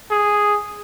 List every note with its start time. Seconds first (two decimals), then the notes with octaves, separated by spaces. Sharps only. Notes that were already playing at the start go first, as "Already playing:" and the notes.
0.11 G#4